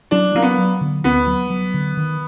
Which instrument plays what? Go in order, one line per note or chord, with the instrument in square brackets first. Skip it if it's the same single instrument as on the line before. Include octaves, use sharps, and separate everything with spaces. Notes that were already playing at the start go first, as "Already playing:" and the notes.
[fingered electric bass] F#3 [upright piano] D4
[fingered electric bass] F#3 [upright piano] A#3
[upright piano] B3
[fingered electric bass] F#3
D3
[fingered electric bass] D2 [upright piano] B3
[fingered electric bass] F#3
F#3
D3
D#3